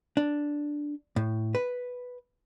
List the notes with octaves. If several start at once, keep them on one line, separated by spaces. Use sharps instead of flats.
D4
A2
B4